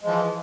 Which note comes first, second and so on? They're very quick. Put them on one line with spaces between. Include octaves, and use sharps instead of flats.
G#3 F3 E3